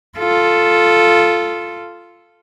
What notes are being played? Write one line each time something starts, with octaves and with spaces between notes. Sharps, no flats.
F4 A4